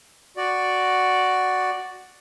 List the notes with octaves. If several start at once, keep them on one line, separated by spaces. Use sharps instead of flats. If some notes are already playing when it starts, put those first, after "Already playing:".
F#4 D5